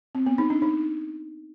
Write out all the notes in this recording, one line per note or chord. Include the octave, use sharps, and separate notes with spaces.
C4
B3
D#4
D4
D#4